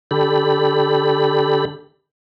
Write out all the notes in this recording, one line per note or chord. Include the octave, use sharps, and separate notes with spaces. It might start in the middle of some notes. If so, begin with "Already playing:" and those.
D3 G4 A4 B5